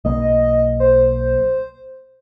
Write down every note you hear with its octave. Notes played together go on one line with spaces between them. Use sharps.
B1 A#3 D#5
C5